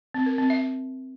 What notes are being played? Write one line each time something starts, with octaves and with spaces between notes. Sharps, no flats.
C4
A#4
C4
E5